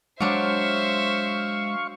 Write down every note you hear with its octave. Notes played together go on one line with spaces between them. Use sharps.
F#3 G#3 D4 C5 E5 F5 C#6